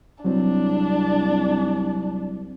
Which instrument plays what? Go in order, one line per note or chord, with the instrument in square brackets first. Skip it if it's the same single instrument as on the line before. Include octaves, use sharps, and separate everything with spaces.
[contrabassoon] C2 [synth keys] F#3 C4 [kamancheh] D4